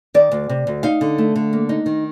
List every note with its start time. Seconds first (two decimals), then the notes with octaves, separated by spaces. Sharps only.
0.14 D#3 D5
0.31 D2
0.49 C3
0.67 D2
0.83 D#4 F5
1.01 D3
1.18 A3
1.36 D3
1.53 A#3
1.69 D#4
1.86 D#3